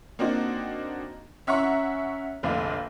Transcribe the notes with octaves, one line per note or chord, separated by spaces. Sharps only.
A#3 C4 D4 D#4 F#4
C#4 E5 F#5 A#5 C#6
F1 A#1 D3 D4 F5